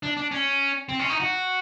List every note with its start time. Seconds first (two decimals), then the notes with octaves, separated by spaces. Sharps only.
0.03 D4
0.17 D4
0.31 C#4
0.89 C4
0.99 C#4
1.10 D#4
1.20 F#4